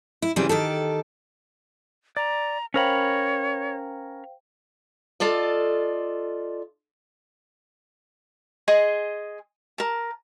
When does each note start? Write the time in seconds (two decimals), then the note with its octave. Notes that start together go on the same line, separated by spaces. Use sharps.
0.22 E4
0.36 C#3 E3 F#3 G3 C4
0.49 D#3 G4 A4
2.17 D5 A#5
2.74 C#4 A#4 C5 C#5 F5 G5 B5
5.20 F4 A4 D5 D#5
8.68 G#4 D#5 C6
9.78 A#4 A5